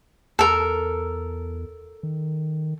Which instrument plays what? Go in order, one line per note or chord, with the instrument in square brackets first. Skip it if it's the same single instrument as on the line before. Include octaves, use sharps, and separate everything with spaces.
[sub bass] E2 [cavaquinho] A4 A#4
[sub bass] D#3